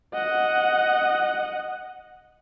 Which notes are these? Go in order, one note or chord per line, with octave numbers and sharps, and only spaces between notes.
D#5 F#5